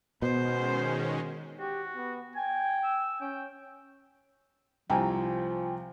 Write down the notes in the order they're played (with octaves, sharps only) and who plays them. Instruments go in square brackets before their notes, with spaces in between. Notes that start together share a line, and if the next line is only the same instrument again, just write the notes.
[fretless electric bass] B2 [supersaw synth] D#3 G#3 C#4 [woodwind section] B3 [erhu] C5
[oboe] F#4 [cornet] G4
[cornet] B3
[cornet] G5 [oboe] G#5
[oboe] E6
[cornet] C#4 [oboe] G5
[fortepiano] C2 [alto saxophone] F3 [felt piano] G5 G#5 A#5